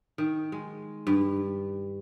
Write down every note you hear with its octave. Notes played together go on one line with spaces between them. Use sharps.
D#3
G#3
G2